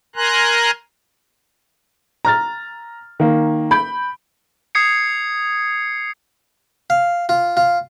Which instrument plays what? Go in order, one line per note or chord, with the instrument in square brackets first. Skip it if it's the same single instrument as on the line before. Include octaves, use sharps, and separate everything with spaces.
[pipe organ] A#4 G#5 A#5 C6 F#6
[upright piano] A#5 F6 A6
D#3 A#3
B5 G6 D7
[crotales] D#6 G#6 C7 C#7
[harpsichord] F5
F4
F4